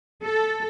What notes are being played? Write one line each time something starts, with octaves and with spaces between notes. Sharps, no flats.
A4